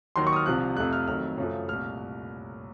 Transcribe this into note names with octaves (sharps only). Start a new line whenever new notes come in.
D#2 D#3 F#3 C6
C#6
D#6
F6
C2 C3 F3 F#6
F2 C3 F3 A3 F#6
F6
F2 D#3 F#3 A3 F6
F#2 C#3 F3 A3
C2 A#2 A3 F6